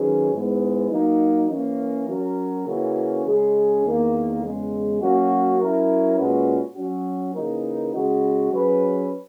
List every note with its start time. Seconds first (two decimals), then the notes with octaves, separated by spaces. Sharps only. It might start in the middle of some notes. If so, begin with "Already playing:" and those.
Already playing: D#3 F#3 C#4 G#4 B4
0.32 G#2 E3 G#3 B3
0.90 F#3 A#3 D#4
1.49 E3 A#3 C#4
2.08 F#3 C#4 F#4 A#4
2.66 C#3 E3 A#3 C#4 F#4
3.25 C#3 G#3 C#4 G#4
3.84 E2 D#3 A#3
4.42 E2 C#3 G#3
5.01 F#3 A#3 C#4 F#4
5.59 F#3 C#4 E4 A#4
6.17 A#2 G#3 C#4 F#4 B4
6.76 F#3 C#4 F#4
7.35 C#3 E3 A#3 D#4 A#4
7.93 C#3 G#3 C#4 F#4
8.51 F#3 C#4 G#4 B4